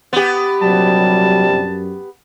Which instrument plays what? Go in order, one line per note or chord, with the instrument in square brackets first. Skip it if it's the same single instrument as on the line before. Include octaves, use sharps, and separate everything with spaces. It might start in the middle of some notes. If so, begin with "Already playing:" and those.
[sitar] B3 G4
[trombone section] A#1 C3 G3 [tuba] F#3 [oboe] A5
[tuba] F#2